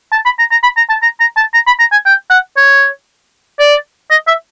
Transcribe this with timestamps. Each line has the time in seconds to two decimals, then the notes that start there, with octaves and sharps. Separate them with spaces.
0.12 A5
0.25 B5
0.39 A#5
0.51 A#5
0.64 B5
0.77 A#5
0.90 A5
1.02 A#5
1.20 A#5
1.37 A5
1.54 A#5
1.67 B5
1.80 A#5
1.92 G#5
2.06 G5
2.30 F#5
2.57 C#5
3.59 D5
4.11 D#5
4.28 E5